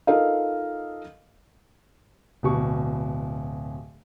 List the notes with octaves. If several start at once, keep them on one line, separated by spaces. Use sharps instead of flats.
D#4 F4 A4 A#4 D#5 F5
D1 B2 C#6